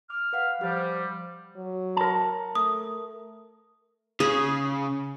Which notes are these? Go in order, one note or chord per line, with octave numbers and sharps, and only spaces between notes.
D6 F6
B4 F5 F#5
F3 G3 G4 C5
F#3
A#4 A5
A3 D#6
C#3 G#4